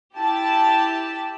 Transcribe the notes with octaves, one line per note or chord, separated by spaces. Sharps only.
E4 G4 A5